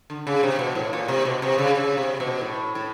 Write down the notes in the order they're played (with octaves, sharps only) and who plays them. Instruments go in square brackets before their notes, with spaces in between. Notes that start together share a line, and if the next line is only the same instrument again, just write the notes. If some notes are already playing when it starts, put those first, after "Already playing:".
[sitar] D3
C#3
C3
B2
A2
A#2
C3
B2
C3
C#3
C#3
C3
B2
A2
A2